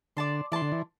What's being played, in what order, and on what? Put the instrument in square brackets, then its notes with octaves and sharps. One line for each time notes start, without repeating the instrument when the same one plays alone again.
[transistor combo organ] D3 [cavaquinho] D5 A5 C6
[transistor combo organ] E3 [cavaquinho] D5 A5 C6
[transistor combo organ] D3
E3